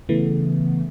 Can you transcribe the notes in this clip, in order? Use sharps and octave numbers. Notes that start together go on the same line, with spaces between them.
C#3 E3 A3 B3